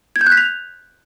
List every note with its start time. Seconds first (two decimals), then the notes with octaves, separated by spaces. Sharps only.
0.16 G#6
0.21 G6
0.27 F#6
0.32 B6
0.37 F7